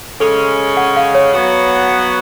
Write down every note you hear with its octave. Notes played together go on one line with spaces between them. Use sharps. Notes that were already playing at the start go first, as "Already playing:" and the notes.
C#3 G#3 C#4 A4
F#5
F5
C#5
F#3 B3 F#4